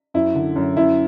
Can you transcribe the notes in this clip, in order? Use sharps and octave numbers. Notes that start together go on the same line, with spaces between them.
F#2 E4
D3
F#2
F#2 E4